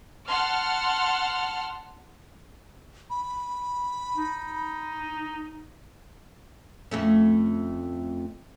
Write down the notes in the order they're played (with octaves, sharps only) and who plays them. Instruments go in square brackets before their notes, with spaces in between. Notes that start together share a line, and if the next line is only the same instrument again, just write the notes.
[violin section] F#5 A5 C6 F6
[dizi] B5
[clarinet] D#4
[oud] F2 A3 C#4